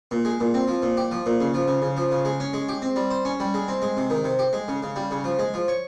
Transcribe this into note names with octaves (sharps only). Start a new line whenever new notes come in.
A#2
G#3
A#2
C4
F3
A#2
G4
F3
A#2
C#3
F3
C#3
C#3
F3
C#3
G#3
C#4
G#3
G4
C4
G3
C5
C#4
G3
G#3
C4
G#3
C3
D#3
C3
G4
G#3
C#3
C#3
G3
C#3
F3
G#3
F3
C#5